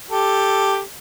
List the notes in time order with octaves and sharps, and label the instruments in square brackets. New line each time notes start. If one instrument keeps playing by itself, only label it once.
[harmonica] G4 A4